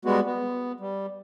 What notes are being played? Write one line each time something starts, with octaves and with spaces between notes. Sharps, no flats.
G3 G#3 B3 F#4
B3
G3